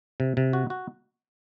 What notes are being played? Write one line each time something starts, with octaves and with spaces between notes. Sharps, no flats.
C3
C3
F#4
F#4